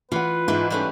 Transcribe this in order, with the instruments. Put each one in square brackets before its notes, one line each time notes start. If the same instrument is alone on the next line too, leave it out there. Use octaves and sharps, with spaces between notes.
[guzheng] E3 [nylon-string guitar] F4 F#5 [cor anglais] B4
[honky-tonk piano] G#2 [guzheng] E3 E4 G5
[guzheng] G3 A3 C#4 [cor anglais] B4